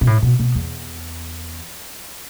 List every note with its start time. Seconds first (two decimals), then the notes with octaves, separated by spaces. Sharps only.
0.01 B2
0.07 A2
0.22 B2
0.39 B2
0.55 E2